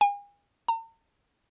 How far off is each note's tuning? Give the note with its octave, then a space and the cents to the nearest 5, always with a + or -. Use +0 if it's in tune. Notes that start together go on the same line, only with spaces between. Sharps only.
G#5 -40
A#5 -45